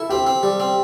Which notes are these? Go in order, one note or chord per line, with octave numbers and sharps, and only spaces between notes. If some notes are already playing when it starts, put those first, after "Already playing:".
Already playing: E4 A4
C4 G4
C4
G3
C4